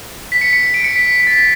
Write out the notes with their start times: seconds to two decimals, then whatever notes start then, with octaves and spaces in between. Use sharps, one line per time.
0.32 B6
0.41 C#7
0.53 C#7
0.63 C#7
0.74 D7
0.80 B6
0.84 C#7
0.96 B6
1.20 B6
1.27 A6